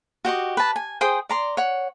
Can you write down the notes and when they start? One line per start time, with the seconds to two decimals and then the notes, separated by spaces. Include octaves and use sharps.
0.25 F#4 G4 D#5 C#6
0.57 B4 A5
0.76 G#5
1.01 G#4 C5 G5 D#6
1.29 D5 A#5 C6
1.57 C#5 F#5